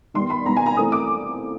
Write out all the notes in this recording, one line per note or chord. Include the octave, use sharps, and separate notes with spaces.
D#3 G3 B3 C6
B5
D#3 G3 B3 A#5
G#5
A#5
E3 A3 C4 D#6
D6